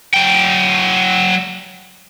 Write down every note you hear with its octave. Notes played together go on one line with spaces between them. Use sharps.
F#3 G5